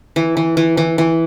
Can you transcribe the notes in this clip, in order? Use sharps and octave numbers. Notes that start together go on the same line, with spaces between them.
E3
E3
E3
E3
E3